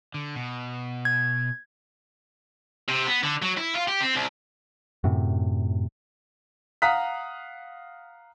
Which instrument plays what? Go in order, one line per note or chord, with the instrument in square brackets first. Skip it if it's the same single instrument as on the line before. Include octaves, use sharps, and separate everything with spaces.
[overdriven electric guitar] D3
B2
[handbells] G#6
[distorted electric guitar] C3
B3
D3
F#3
E4
F4
G4
C4
C2
[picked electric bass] F#2 A2 C3
[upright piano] F5 F#5 A#5 D#6 F#6 B6